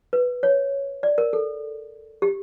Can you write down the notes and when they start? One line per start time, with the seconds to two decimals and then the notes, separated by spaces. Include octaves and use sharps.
0.13 B4
0.43 C#5
1.03 D5
1.18 A#4
1.33 A4
2.22 G4